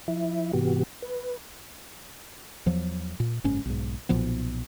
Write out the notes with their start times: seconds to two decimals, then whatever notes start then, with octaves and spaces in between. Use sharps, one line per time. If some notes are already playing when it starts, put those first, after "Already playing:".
0.08 F3 E4 E5
0.53 G#2 C3 E3 B3 F#4 G4
1.02 B4
2.66 E2 F3 F#3
3.20 A#2
3.44 F#1 G#2 C#4
3.66 B1 G#2
4.09 B1 A#2 F3 B3